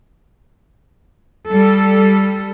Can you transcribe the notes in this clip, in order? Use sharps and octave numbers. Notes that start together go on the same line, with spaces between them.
G3 A4